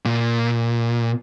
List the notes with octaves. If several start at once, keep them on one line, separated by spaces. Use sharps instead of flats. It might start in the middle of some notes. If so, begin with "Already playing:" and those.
A#2